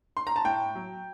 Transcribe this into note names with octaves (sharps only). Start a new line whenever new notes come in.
C6
A#5
A5
A2 G5
F#3